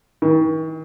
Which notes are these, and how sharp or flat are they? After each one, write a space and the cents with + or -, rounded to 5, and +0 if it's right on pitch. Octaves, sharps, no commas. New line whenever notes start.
D#3 +45